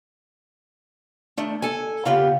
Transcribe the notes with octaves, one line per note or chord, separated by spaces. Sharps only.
D#3 A3 D4
A4 G#5
C#3 A#3 B3 F4 G4